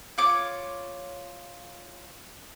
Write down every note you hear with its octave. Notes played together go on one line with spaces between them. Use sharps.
F4 C#5 D6